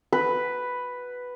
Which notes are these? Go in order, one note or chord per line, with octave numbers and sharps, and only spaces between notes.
B4